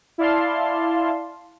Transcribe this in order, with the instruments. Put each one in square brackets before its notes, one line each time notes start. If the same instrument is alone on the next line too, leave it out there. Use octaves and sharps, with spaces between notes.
[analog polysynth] E4 D5 F5 A5 C6